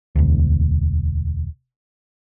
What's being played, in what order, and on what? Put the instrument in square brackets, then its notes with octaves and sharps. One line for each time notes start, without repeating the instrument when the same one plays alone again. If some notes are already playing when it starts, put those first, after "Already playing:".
[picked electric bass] E1 D2